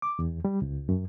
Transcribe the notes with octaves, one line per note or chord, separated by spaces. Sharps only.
D6
E2
G3
C#2
F#2